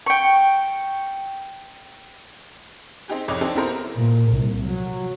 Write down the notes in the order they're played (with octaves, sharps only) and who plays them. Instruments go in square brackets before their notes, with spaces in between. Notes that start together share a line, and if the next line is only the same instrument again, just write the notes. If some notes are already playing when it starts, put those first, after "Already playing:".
[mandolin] G5 C#6
[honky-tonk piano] C4 D#4 G4 G#4
C2 F2 C#5 D#5 D6
C4 D4 D#4 G4 A4
B3 C4 E4 A4 A#4 C5
[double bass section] A#2
C2
F#3